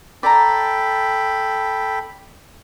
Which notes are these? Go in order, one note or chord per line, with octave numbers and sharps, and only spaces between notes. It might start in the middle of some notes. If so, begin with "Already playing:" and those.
A4 D5 G5 A#5 B5